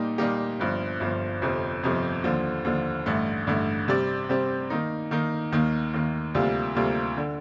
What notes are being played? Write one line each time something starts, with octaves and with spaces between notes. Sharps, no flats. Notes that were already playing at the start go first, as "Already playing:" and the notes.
Already playing: A#2 G3 A#3 D#4 G4
A#2 G3 A#3 D#4 G4
G1 G2 F3
G1 G2 F3
G1 F2 C3 F3
G1 F2 C3 F3
D#2 D3 F3
D#2 D3 F3
A1 G2 D3 A3
A1 G2 D3 A3
C3 G3 C4 G4 D5
C3 G3 C4 G4 D5
D#3 A#3 D#4
D#3 A#3 D#4
D#2 D#3 A#3
D#2 D#3 A#3
D2 C3 G3 A#3 F4
D2 C3 G3 A#3 F4
D3